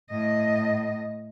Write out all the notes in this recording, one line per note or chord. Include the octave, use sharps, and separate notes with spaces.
A2 D#5